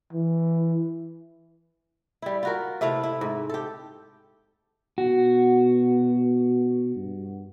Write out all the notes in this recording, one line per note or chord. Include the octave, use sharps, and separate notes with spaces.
E3
G3 E4
F4 F#4 A#4
C3 A3 E4 F5
E4
G#2
G4 A4
B2 F#4
G2